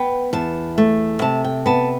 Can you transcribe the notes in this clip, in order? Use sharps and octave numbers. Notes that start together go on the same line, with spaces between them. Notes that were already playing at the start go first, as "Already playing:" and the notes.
Already playing: B3 G5
E2 A5
A3
C3 A5
G5
B3 A5